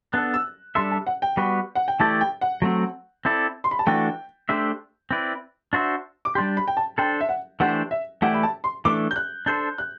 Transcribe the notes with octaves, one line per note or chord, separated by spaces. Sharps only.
B3 D4 A4 F#6
E6
G3 D4 A4 E5 C6
A5
F#5
G5
G3 B3 F#4 B4
F#5
G5
E3 A3 E4 G4 D5 A5
G5
F#5
F#3 A3 C4
C4 E4 A4 D5
C6
B5
A5
E3 A3 D4 F#4 G5
A3 D4 G4 C5 E5
C4 E4 B4 D5
D4 F#4 C5 E5
D6
G3 D4 G4 C6
B5
G5
A5
D4 A4 C5 G5
E5
F#5
E3 A3 D4 G4 C5 F#5
E5
E3 A3 E4 G4 D5 F#5
B5
A5
C6
E3 A3 D4 D6
G6
F#6
D4 A4 C5 G6
F#6